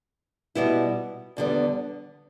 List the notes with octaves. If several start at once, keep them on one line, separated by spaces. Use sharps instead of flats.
B2 G3 B3 E4
E2 D3 G3 B3